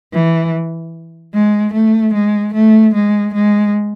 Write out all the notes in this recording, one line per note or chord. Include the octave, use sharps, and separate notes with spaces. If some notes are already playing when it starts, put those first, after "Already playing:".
E3
G#3
A3
G#3
A3
G#3
G#3